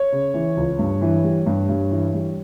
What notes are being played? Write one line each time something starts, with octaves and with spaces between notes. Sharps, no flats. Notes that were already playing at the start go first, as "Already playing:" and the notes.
Already playing: C#5
C#3
E3
C#2
G2
E3
G3
G2
G2
E3
G3